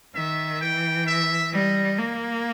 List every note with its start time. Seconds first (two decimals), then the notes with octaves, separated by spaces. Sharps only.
0.15 D#3 E5
0.61 E3 G5
1.06 E5
1.53 G3 D#5
1.98 A#3